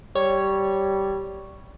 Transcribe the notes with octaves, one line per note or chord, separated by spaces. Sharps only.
G3 C#5